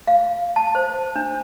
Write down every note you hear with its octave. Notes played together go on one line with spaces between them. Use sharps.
F5
A5
C5
D4